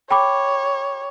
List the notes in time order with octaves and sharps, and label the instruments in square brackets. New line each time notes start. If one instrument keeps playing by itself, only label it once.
[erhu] C#5 [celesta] G5 B5 D6